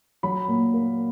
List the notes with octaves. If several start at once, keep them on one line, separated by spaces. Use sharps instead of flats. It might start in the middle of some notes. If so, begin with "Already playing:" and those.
F#3 B5
A#2
A#3